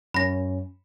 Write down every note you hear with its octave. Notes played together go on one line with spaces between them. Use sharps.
F#2 C#4 B5 A#6